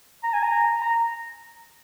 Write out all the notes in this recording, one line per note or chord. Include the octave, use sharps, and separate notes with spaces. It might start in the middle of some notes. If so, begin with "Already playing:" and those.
A#5
G#5
A#5
A#5